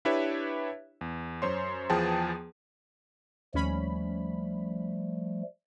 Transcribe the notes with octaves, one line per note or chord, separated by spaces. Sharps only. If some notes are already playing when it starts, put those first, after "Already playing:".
D4 E4 G4 B4 C#5 E5
E2
F#2 C5 C#5 C6
E2 F3 B3 G#4 G5 A5
D#2 F3 G3 A3 C#4 B5